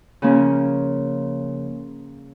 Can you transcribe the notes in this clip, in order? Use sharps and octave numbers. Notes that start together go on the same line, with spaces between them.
C#3 F3 A#3 C#4